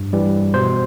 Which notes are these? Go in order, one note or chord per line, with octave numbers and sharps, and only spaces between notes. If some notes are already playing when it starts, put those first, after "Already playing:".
Already playing: G2
E3 G3
B2 C5